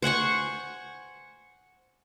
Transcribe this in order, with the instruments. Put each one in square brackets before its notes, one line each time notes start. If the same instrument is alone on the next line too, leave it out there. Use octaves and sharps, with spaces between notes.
[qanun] C5 F#5 G#5 C#6